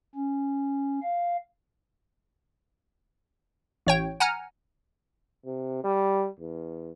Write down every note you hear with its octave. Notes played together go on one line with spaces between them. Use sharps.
C#4
F5
A1 C#5 G5
F#5 G#5 A#5 F6
C3
G3
E2